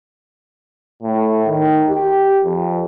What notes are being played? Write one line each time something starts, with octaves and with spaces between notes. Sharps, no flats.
A2
D#3
G4
F2